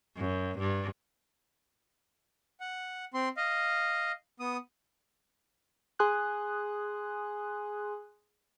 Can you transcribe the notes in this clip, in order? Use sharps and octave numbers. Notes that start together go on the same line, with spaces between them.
F#2
G2
F#5
C4 C6
D#5 F5
B3 D#6
G#4 G#5 C6 D#6 F#6